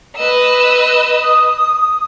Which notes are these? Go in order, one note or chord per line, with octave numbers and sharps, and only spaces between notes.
B4 D#5 E6
D#6